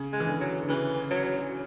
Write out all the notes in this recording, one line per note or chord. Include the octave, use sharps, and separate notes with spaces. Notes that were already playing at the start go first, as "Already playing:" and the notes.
Already playing: C#3
G#3
E3
D3
F#3
D3
C#3 E3
F#3